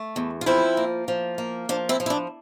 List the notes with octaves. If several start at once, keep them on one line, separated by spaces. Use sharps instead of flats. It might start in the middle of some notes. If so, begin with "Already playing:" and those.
Already playing: A3
E2
F4
F3 C4 E4
A#3
F3
A#3
F3 D4
C4 E4
F3
E4
D4